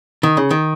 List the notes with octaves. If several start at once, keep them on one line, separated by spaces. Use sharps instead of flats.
D#3
C#3
D#3